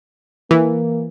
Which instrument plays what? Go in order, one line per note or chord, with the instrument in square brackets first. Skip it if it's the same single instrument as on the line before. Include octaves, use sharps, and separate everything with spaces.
[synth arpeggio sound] E3 [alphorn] A#3